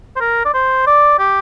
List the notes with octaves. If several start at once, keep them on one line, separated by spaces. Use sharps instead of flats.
C5
A#4
D5
C5
D5
G4